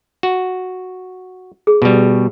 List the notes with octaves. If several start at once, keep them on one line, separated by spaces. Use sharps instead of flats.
F#4
G#4
B2 G3